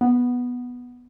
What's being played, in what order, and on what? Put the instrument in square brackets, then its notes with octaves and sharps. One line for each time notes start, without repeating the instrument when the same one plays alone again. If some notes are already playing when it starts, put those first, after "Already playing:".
[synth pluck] B3